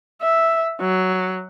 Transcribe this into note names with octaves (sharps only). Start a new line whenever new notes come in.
E5
F#3